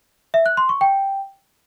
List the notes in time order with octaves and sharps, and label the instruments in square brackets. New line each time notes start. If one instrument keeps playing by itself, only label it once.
[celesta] E5
F#6
C6
C#6
G5